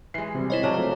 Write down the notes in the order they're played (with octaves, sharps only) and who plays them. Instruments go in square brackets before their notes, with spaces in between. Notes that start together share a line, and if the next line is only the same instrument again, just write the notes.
[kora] E3 G#3 [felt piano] C7
[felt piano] C3 G3
[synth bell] E4 C5 D#5 [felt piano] C#5
[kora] C#3 F#3 D4
[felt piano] F3 A3 C4